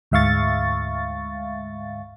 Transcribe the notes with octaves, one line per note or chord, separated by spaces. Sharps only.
D2 G#2 E5 F5 C#6 A6